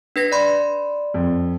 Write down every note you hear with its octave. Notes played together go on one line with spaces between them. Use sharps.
D4 B4 A#6
D5 B5 C6
F2